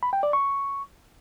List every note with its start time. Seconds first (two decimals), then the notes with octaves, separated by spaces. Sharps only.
0.03 B5
0.13 G5
0.23 D5
0.33 C#6